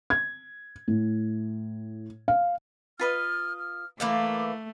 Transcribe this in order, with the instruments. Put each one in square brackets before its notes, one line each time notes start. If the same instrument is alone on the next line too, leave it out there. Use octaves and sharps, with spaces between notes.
[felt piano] G#6
A2
F5
[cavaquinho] F4 B4 D#5 [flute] F6
[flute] F6
[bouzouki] E3 A#3 D5 [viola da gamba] A3 [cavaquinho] F5 [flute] D6